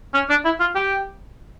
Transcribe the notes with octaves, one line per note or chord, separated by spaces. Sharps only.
C#4
D4
E4
F4
G4